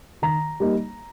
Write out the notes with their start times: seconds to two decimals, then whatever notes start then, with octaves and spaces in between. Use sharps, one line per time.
0.22 D#3 A#5
0.60 G3 A#3 D#4